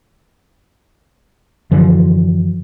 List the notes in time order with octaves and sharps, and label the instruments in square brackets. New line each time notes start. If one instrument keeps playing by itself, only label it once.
[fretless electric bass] F#2 D3 E3 F3